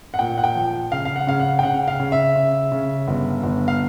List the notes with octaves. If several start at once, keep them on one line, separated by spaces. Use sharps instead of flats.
F#5
A#2 G5
F#5
G5
F3
C#3 F5
F5
F#5
C#3 F5
F#5
G5
C#3 F#5
F5
C#3
E5
C#3
C#3
G1
G1
F5